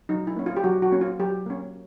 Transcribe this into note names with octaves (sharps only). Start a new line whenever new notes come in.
F#3 D#4
E4
A#3 C#4
F4
G4
F#3 F#4
F#4
A#3 C#4
F4
F#3 G4
A#3 C#4